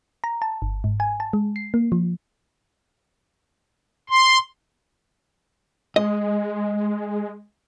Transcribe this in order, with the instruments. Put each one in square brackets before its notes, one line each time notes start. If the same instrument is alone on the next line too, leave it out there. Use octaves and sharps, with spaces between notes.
[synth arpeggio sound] A#5
A5
G1
G#2
G#5
A5
G#3
C7
A#3
F3
[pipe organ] C6
[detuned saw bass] G#3 [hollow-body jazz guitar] D#5